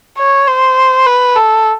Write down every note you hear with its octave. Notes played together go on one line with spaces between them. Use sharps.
C#5
C5
B4
A4